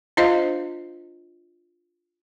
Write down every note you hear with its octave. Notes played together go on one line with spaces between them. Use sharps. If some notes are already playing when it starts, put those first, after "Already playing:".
D4 F4 C5 D#5 F5